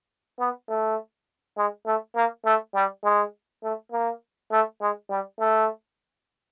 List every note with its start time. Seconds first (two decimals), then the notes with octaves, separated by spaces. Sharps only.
0.40 B3
0.69 A3
1.57 G#3
1.86 A3
2.16 A#3
2.45 A3
2.75 G3
3.04 G#3
3.63 A3
3.92 A#3
4.52 A3
4.81 G#3
5.10 G3
5.40 A3